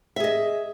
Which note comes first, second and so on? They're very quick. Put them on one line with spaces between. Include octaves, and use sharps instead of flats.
E5 G#4 D#5